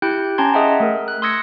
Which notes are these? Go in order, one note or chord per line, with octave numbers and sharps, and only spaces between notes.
E4 G4 G5 F#6 G6
C#4 G5 A5 A#5 C6 G#6
G#4 D#5 E5 F#5 G5
A3 A#4
F#6
C6 D#6 E6 G#6 A#6 C#7